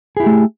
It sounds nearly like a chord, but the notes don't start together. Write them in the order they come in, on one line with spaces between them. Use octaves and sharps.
G#4 E4 G4 A3